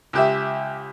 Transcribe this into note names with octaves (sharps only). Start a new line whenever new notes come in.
C#2 G4 E5